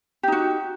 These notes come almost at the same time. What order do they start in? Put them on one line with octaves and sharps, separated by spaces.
G4 D#4 F#4